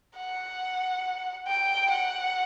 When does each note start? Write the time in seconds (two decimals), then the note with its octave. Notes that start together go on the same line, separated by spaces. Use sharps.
0.17 F#5
1.47 G5
1.91 F#5